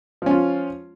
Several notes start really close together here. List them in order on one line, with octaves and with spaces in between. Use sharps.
F3 C#4 F4